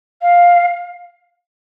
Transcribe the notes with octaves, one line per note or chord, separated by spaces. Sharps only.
F5